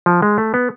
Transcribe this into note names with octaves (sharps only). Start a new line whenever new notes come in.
F3
G#3
A3
B3